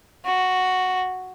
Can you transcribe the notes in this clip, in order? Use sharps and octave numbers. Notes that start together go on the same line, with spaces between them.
F#4